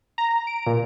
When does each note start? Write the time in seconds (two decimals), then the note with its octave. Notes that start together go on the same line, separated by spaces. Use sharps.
0.18 A#5
0.47 D7
0.66 A#2